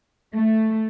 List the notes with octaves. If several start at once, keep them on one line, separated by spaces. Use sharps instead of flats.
A3